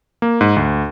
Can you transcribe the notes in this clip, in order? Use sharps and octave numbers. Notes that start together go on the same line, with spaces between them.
A#3
G#2
D2